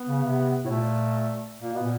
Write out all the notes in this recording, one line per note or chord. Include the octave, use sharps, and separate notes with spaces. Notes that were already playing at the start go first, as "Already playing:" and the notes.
Already playing: B3
C#3
C3
A2
A#2 A3
A#2 A#3
B2 B3
A#2